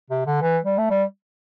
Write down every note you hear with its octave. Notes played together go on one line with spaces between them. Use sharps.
C3
D3
E3
G3
A3
G3